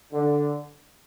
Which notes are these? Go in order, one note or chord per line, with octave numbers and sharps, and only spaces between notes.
D3